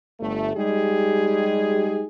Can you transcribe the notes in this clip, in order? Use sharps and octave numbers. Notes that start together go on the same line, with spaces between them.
G1 A3
G3 G#3 D#4 G4 G#4